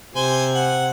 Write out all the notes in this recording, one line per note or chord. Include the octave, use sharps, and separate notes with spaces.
C3 C5 G#5
F#5